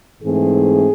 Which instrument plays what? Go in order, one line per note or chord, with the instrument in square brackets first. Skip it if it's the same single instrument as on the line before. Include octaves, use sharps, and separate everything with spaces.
[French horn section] G#2 E3 A3 C4 G#4